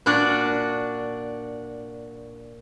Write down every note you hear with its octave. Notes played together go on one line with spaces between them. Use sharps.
A#2 D4 F#4 D5